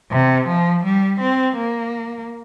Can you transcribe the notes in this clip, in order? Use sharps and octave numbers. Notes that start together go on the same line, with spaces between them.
C3
F3
G3
C4
A#3